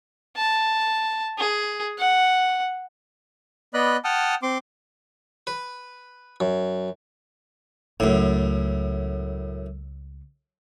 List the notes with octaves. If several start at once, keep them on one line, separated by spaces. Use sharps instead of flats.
A5
G#4
F#5
B3 D5 D#5 B5 F#6
F#5 G5 A5 D#6 F6
C4 C6 D6
B4
F#2
C#2 F#2 A2 A3